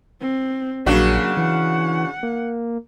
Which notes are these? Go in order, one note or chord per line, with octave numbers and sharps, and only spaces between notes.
C4
A#1 C#3 F#3 A#3 D4 F#4
E3 F#5
A#3